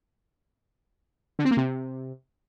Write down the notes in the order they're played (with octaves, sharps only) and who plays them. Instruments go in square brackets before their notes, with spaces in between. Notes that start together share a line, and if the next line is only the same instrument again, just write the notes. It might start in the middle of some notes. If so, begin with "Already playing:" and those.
[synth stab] D3
C4
A#3
C3